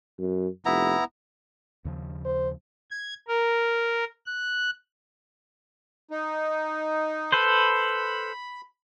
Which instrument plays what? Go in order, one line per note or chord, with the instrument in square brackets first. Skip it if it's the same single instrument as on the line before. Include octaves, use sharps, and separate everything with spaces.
[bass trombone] F#2
[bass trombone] F1 [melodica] B3 E4 A#5
[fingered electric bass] D#2 C#3 F3
[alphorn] C5
[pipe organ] G#6
A#4
F#6
[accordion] D#4
[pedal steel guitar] A4 B4 C5 [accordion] B5